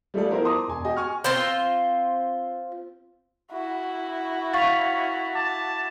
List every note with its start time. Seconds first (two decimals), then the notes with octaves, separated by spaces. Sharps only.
0.14 G3 A3 F4 G#4 A4 D5
0.29 F3 B3 E4 A#4 C5
0.45 A5 A#5 C6 D6 D#6
0.68 E1 G#5
0.84 F#4 G#4 D#5 G5 G#5
0.97 G#5 C#6 F6
1.24 C4 F4 C5 G5
3.52 E4 F#4
4.54 C#4 F5 C#6 A6 B6 F7
5.35 A5 D6